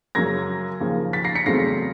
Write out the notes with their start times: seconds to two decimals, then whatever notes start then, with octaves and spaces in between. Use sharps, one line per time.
0.15 F#2 C#3 F#3 G#6 A#6
0.80 D#2 C#3 F3
1.13 A6 B6
1.24 A#6 C7
1.35 B6 C#7
1.46 E2 C#3 F#3 A3 C4 A#6 C7